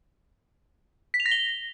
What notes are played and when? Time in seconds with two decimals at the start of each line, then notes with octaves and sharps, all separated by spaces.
1.14 B6
1.20 F7
1.26 A#6
1.31 G7